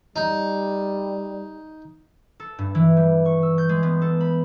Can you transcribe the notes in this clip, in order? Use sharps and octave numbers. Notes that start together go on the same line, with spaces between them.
G3 D#4
A4
G2
E3
G3
C#6
E6
G6
G#3
B3
A4
B5